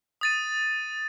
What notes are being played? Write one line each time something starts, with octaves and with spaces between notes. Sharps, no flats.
D#6 A6 D#7